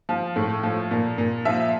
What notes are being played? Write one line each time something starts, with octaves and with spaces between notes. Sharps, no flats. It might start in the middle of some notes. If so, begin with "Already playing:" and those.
F3
A2
F3
A#2
A#2
F3 E5